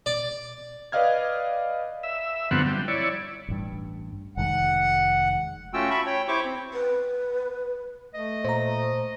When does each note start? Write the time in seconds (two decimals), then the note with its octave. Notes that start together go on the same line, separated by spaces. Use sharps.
0.06 D5
0.92 B4 D5 D#5 F5 F6 G#6
2.03 E5
2.51 G2 D3 F3 B3 C4 F#5
2.66 G3
2.88 E4 C#5 D5
3.49 A1 G2
4.37 F1 D#3 G#3 F#5
5.73 A3 C#4 F4 F#4 G5 E6
5.90 E5 A5 B5 C#6
6.06 C#5 G5
6.28 E4 G4 C5 C#6 D6
6.45 C4
6.74 B4
8.14 A3 D#5
8.44 A#2 C5 A#5